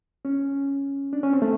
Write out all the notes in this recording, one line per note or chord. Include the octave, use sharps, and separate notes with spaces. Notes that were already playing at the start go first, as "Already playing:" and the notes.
C#4
D4
C#4
C4
A3